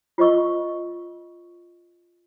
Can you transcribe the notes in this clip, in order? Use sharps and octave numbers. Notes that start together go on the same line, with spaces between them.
F4 C5 D#5 C#6 E6